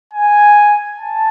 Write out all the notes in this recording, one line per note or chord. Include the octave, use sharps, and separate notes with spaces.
G#5
A5